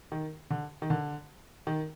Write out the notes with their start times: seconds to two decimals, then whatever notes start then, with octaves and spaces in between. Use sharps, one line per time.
0.12 D#3
0.50 D3
0.82 D#3
0.90 D3
1.67 D#3